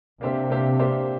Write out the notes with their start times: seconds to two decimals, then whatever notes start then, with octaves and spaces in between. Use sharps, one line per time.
0.21 C3 A#3 D4 G4 C5 E5
0.50 A#3 D4 G4 C5 E5
0.79 A#3 D4 G4 C5 E5